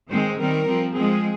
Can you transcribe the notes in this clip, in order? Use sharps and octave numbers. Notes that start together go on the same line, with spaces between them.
D#3 G#3 C4 C5
D#3 G3 C4 A#4
F3 C4
F3 G#3 C4 G#4